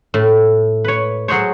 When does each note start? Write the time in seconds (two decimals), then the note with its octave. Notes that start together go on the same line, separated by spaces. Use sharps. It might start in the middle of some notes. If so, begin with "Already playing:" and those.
0.14 A2
0.84 B4 C#5
1.28 F#3 F#4 G#4 C5 C#5